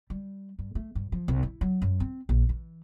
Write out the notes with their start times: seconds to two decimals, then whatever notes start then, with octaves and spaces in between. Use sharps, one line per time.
0.10 G3
0.59 G2
0.75 A3
0.95 G2
1.12 F3
1.28 C2
1.43 E4
1.61 F#3
1.82 F#2
2.00 C4
2.29 A#1
2.49 E3